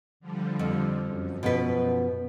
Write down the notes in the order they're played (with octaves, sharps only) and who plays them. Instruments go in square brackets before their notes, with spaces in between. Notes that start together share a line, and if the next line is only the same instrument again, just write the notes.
[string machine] D3 F3 G3
[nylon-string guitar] F2
[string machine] F#2
[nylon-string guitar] B2 F3 B4